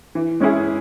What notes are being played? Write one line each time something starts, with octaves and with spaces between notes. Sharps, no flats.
E3
G#3 C#4 E4 G#4